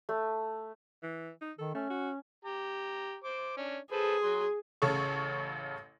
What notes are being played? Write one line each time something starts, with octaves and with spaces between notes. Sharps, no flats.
A3
E3
D#4
D#3 A4
A3 C#4
F#4
G4 A#5
C5 D6
C#4 D4
G#4 A4 B4 C5
F#3 C6
A1 C#3 A4 C#5 C#6